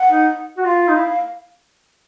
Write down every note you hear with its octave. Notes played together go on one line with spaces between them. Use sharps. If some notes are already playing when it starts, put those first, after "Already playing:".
Already playing: F#5
D#4
F#4
F4 F5
D#4
E4